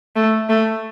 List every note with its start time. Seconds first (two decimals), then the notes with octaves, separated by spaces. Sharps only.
0.16 A3
0.49 A3